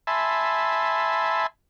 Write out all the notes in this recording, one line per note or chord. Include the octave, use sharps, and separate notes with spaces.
E5 G#5 A5 B5 C6